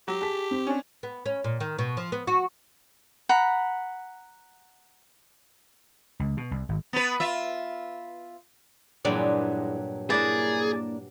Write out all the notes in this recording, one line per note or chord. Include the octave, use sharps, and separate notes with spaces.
F#3 G4
G#4 A5 B6
C4
C#4 D4
B3
C#4
A#2
D#3
B2
F3
B3
F#4
F#5 A#5 B5
C#2
B2
C2
G#1
B3 B4
F4 E5
G2 A#2 E3 F#3 G#3 D5
A#3 D4 E4 G#4 D5